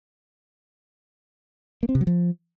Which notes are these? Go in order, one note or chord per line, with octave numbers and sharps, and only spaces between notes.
A#3
C4
C3
F#3
F3